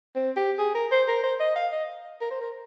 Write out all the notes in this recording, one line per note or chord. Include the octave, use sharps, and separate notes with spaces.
C4
G4
G#4
A#4
C5
A#4
C5
D#5
F5
D#5
A#4
C5
A#4